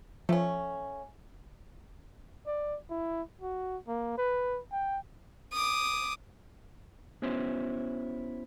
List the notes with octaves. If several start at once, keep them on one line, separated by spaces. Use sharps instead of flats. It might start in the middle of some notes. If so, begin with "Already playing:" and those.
F3 A3 C#4
D5
E4
F#4
A#3
B4
G5
D6 D#6
B3 C#4 E4 F#4 C5 C#5